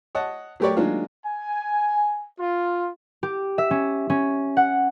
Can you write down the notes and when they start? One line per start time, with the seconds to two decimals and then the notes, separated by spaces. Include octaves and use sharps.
0.15 C#5 D#5 F#5 A5
0.60 F#3 A3 G4 A#4 C#5 D5
0.77 D#3 F#3 G#3 A#3 D4 F4
1.26 G#5
2.39 F4
3.23 G4
3.58 E5
3.71 C#4
4.10 C#4
4.57 F#5